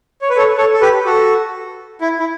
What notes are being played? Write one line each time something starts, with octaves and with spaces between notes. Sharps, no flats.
C#5
B4
A4 C#5
A4 C#5
A4
G4 B4
F#4 A4
E4
E4